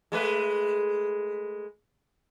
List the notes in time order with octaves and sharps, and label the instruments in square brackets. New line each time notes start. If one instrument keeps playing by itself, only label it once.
[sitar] G#3 A3 B4